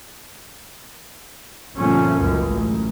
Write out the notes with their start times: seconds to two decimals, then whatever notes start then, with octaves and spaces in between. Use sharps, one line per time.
1.74 G1 A#2 F3 A3 C#4
2.16 F#1 C#2 F#2
2.46 A1